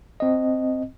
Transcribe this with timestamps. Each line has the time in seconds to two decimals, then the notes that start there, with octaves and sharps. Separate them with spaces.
0.20 C4 D#5